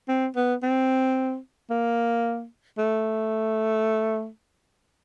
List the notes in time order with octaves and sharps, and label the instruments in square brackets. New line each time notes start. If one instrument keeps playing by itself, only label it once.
[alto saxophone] C4
B3
C4
A#3
A3